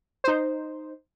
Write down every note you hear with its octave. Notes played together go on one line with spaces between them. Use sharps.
D#4 C5